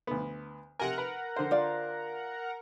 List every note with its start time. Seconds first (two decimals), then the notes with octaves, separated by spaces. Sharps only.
0.07 D2 B3
0.80 C3 A#4 F#5 G#5 A#5
0.98 B4
1.36 D3 C5
1.51 F4 D5